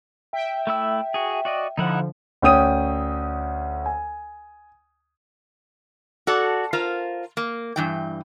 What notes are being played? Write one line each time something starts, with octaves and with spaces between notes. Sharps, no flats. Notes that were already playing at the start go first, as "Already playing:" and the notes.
E5 G5
A3 E4 E6
F#4 G#4
F#4 D5 D#5
D3 F3 D#4 E4 F#5
D2 C#4 G5 D#6 D#7
G#5
F#4 A4 D5
F4 A#4 C5 F5
A#3
G2 E3 G5